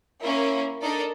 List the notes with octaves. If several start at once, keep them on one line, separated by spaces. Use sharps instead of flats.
A#3 C#4 E4 A#4
D4 D#4 A4 A#4 D5